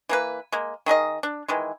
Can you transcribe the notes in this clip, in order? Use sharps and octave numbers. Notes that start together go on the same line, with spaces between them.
E3 A#3 B4
G#3 A#3
D#3 G#4 A#4 D#5
D4
D#3 E3 G#3